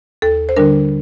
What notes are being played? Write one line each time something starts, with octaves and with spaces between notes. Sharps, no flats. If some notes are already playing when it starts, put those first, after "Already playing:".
D#2 A4
C5
D3 G3 D4 A#4